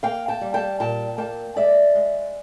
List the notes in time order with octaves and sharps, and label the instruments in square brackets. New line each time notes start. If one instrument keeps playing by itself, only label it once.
[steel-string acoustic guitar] A#3 F5 G5
G5 A5
G3
G5 A5
A#2 G5 A5
A#3 G5 A5
G#3 D5 E5
G#3